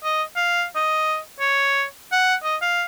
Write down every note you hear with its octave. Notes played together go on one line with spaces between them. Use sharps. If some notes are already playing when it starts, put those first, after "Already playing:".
D#5
F5
D#5
C#5
F#5
D#5
F5